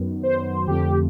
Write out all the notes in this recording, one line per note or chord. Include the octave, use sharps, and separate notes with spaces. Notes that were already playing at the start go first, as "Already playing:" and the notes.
Already playing: F#2 D#3 F#3 B3
C5
F2 D3 F3 A3 C4 G4